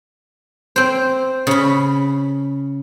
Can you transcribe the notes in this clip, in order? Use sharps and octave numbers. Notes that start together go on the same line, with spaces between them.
C4 C5
C#3 B5